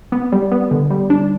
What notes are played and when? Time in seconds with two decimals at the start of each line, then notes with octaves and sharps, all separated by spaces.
0.12 B3
0.32 G3
0.52 B3
0.71 D3
0.91 G3
1.10 D4